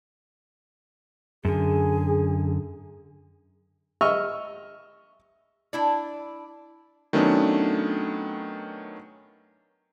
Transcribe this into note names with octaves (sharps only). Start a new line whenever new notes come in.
F#2 D3 G#4
D#5 E5 C#6 E6 F6
D4 E4 D5
D#3 F#3 A3 B3 C#4 D4